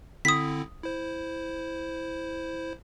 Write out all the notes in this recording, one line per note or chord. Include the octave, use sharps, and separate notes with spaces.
D3 C4 E4 D#6 B6
E4 C5